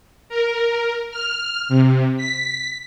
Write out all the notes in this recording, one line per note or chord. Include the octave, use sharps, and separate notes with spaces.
A#4
F6
C3
B6